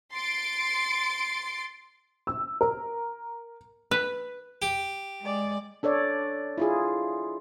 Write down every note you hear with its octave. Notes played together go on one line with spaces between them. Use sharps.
C6 A6 C7 D7
E6
A#4
B4
G4
G#3 D5
D4 A4 C#5 D5
E4 F4 G#4